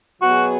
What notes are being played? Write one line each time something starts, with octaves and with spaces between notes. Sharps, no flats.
B2 F#3 B3 F#4 G#4